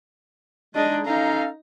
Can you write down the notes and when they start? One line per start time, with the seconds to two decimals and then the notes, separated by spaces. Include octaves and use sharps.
0.75 G#3 D4 D#4 G#4 D#5
1.05 C#4 D#4 A4 F5 A#5